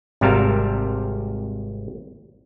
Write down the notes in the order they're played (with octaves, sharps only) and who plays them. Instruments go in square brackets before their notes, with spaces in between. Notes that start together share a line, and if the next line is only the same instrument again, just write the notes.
[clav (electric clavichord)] G#1 C3 G3 A#4 F5 A5